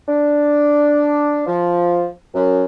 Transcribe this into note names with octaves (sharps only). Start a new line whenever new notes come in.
D4
F3
F#2